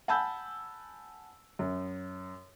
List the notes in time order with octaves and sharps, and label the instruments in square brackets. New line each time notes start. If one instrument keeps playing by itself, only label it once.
[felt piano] F#5 G#5 A5 B5 E6 G6
F#2